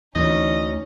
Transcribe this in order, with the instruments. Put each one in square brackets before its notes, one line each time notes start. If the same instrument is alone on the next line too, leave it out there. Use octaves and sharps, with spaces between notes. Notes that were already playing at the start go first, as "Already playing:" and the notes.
[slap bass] D2 [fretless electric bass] E3 [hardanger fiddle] C#4 D#4 [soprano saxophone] D#5